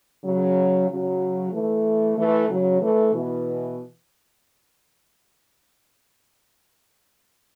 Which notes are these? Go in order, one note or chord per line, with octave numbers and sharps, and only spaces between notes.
C#3 F#3
C#3 F#3
E3 A3
E3 A3
C#3 F#3
E3 A3
B2 E3